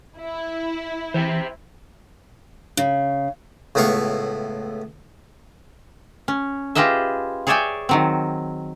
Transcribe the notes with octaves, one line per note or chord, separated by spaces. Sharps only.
E4
E3 C5 E5 G5
C#3
C#2 A2 B3 E4 F5 C#6
C#4
F4 G4 G#4 B4 D#5 E5
G#4 C#5 D5 E5 G5 G#5
D#3 F#3 C4